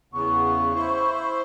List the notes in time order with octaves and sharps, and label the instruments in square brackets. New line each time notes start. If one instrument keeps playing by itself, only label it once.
[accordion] E2 C#3 B3 [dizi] C#6
[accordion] E4 C5